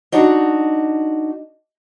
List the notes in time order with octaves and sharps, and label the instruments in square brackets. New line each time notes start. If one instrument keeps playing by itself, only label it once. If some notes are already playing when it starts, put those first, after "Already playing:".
[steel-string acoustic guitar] D4 D#4 F#4